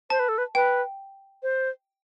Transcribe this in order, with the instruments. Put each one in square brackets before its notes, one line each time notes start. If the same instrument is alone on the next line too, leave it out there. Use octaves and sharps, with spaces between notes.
[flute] C5 [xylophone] A5
[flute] B4
A4
B4
[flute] B4 [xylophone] G5
[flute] C5